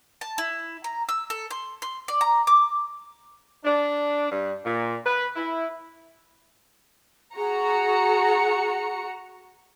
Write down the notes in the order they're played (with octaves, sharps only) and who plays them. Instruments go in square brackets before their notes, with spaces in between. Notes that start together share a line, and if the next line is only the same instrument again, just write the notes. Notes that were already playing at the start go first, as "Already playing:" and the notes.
[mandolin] A5
E4
A#5
E6
A4
C6
C6
D5
A#5
D6
[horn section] D4
G2
A#2
B4
E4
[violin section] F#4 A#5 C#7 [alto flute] G#4